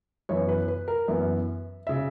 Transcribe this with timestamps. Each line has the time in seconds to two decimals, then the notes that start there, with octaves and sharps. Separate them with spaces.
0.29 F#2 E3 B3 C#5
0.49 B4
0.68 B4
0.88 A#4
1.08 F#2 E3 B3 E5
1.87 C#3 E5